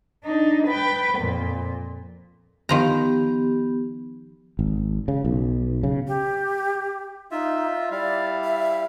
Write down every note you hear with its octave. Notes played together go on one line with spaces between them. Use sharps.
D4 D#4
B4 G5
F2 A#2
D#3 F3 B3 G4 A#5
G#1
C#3
B1
C#3
G4
D#4 F4 E5
D#5
G3 E4 D5 F5
E5